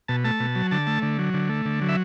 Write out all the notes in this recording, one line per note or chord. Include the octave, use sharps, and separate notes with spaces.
B2 A5
A3 A5
B2
F#3
D3 A5
A3
D3
F#3
D3
A3
D3
F#3
E5